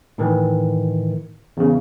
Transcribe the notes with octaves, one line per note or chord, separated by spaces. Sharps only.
A2 D#3 E3
E2 C#3